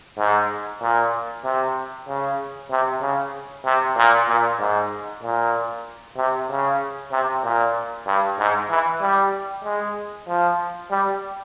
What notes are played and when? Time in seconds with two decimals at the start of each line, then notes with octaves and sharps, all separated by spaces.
0.18 G#2
0.81 A#2
1.44 C3
2.07 C#3
2.70 C3
3.02 C#3
3.65 C3
3.97 A#2
4.28 A#2
4.59 G#2
5.23 A#2
6.17 C3
6.49 C#3
7.12 C3
7.44 A#2
8.07 G2
8.39 G#2
8.70 E3
9.01 G3
9.64 G#3
10.28 F3
10.91 G3